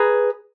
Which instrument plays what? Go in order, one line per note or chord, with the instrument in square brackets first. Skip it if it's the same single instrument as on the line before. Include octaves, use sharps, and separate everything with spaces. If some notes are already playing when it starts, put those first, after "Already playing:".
Already playing: [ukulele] G#4 B4 A#5